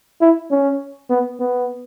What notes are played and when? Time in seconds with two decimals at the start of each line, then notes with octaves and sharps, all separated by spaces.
0.21 E4
0.51 C#4
1.10 B3
1.40 B3